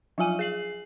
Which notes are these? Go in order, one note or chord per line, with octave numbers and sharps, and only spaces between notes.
F3 F#3 F4 G#5 D#7
G#4 C7 F#7